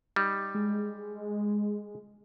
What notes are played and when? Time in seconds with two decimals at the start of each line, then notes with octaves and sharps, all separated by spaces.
0.16 G3 D#4
0.55 G#3